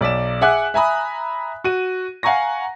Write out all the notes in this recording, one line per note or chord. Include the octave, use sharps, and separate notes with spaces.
B1 D5 B6 E7
G#4 E5 F#5 G#5 D6 F#6
E5 G#5 A#5 B5 D#6
F#4 D#7
F5 F#5 G#5 A#5 C#6 A#6